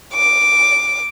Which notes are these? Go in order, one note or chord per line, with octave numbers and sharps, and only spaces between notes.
D6